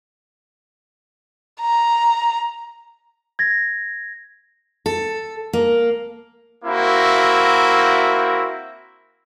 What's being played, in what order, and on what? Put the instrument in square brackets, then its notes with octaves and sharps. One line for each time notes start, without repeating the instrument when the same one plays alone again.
[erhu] A#5
[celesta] G#6 A#6
[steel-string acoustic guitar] A4
A#3
[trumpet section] A#3 C4 E4 F#4